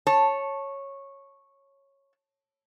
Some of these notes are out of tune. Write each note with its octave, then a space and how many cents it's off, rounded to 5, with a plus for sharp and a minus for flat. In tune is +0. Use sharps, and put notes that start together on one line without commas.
C#5 -10 A5 +0